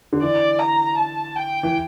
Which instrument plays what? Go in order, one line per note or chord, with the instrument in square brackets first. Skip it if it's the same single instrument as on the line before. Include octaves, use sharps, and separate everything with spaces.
[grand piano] D3
[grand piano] E3 [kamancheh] D5
[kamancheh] A#5
A5
G5
[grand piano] E3